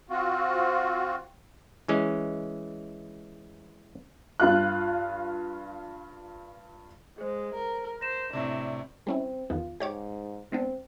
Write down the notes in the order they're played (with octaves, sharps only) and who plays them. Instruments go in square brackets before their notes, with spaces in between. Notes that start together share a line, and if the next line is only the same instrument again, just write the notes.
[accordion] C4 F4 F#4
[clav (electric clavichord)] E3 G#3 C#4
[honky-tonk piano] G2 F4 F#6
[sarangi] G#3 [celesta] G#4 C5
[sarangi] A#4
[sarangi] C5 [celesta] A#6 E7
[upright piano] A2 C3 [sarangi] D4
[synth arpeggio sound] G3 C#4 E4 [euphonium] C4
[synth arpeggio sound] E2 D#3 B3 [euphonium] F4
[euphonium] G#2 [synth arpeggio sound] G4 C#5 D6
[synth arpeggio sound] G#3 B3 D4 [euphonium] C4